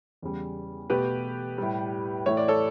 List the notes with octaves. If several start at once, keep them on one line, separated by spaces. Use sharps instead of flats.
E2 C#3 G3
B2 A3 G4 B4
A2 G3
A2 E3 A3 C#5
D5
A4 C#5